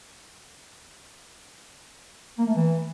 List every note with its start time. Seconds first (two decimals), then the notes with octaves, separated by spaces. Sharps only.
2.38 A#3
2.47 A3
2.55 E3